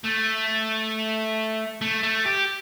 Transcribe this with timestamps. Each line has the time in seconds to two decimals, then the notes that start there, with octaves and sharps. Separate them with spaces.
0.04 A3
1.81 A3
2.03 A3
2.26 G4